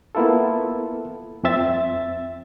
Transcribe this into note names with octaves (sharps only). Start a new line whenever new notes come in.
A#3 B3 E4 F4 A4
F2 F3 C4 E5 A6